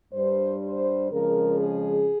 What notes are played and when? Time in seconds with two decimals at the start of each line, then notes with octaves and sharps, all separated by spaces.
0.12 G2 G3 C5
0.62 C5
1.11 F2 C#3 F3 G#3 A#4
1.60 G#4